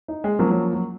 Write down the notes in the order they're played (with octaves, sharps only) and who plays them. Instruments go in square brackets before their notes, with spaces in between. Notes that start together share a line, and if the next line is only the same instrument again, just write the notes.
[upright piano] D#4
G#3
[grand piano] F3 A#3 C#4 [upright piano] F#3
[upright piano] F#3
F#3